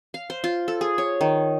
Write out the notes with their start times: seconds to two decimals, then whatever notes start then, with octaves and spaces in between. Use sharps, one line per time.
0.14 F5
0.30 C5
0.44 F4
0.68 A4
0.81 G#4
0.98 C#5
1.21 D#3